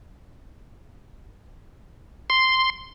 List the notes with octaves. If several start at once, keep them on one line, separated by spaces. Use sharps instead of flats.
C6